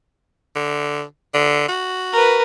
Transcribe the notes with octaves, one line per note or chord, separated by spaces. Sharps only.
D3
D3
F#4
A#4 B4